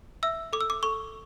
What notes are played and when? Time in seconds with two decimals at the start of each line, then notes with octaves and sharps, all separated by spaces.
0.23 E5 E6
0.53 A4 D6
0.61 E6
0.70 D6
0.83 A4 C#6